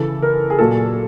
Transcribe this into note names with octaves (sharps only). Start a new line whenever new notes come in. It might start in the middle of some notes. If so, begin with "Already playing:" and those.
Already playing: C#3 E3 A4
A#4
G#4
A#2 F#3 A4